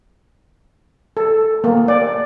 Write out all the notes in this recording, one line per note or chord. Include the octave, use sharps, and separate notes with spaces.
A4
A#3
D5